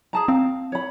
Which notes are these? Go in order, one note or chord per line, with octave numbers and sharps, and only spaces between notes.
G#4 A5 A#5
C4 F5
C#5 B5